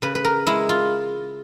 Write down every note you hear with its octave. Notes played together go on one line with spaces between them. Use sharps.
C#3 B4
B4
A#4
G#3 E4
F4